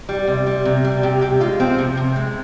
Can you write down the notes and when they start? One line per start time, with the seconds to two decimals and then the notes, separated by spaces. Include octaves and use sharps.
0.09 G3
0.27 C3
0.47 G3
0.65 C3
0.85 G3
1.03 C3 G4
1.22 C3 G4
1.40 G#3 F4
1.60 F3 C4
1.78 C3
1.97 C3
2.16 G#3